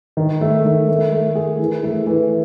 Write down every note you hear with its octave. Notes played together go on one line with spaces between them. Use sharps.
D#3
A3
D#3
A3
A3
G#4
E3
A3
E3